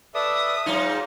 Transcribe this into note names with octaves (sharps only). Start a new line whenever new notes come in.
A4 B4 D5 E5 D#6
G#2 F#3 D#4 F4 A5